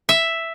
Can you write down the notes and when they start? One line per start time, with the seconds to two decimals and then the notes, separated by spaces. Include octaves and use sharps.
0.09 E5